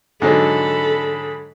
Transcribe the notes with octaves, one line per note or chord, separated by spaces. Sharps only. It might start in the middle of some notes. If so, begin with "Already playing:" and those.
G#2 D3 F#3 A4 B5